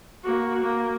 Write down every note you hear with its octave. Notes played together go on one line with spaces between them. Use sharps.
A#3 F#4
A#3